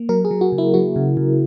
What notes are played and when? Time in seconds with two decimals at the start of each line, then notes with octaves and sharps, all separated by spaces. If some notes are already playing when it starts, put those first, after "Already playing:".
Already playing: A#3
0.09 F#3 A#4
0.25 G#4
0.31 F#3
0.41 F#4
0.52 C#3
0.58 E4
0.74 F#3 F#4
0.96 C#3
1.17 C#3